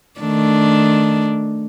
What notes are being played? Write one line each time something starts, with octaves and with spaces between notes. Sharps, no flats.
D#3 A3 D4